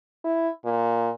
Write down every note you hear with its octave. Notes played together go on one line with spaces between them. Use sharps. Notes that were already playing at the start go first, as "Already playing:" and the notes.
E4
A#2